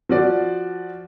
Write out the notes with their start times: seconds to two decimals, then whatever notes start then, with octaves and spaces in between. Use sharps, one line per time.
0.09 F3 F#4 D5